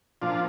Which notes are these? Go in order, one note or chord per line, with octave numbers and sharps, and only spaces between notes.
A#2 F3 D4 F4